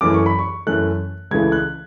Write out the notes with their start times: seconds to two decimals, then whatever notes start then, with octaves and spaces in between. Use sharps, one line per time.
0.01 F#2 E3 A3 D6
0.14 C#6
0.26 B5
0.39 C#6
0.67 F#2 E3 A3 F#6
1.31 C#2 C#3 E3 A3 G#6
1.52 F#6